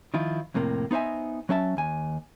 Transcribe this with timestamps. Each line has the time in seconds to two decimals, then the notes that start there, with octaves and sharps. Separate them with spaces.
0.14 D#3 F3 E4 F4
0.54 F2 A2 C3 A#3
0.91 B3 D#4 C5 E5 G#5
1.49 F#3 C#4 E5 A5
1.77 D#2 G#5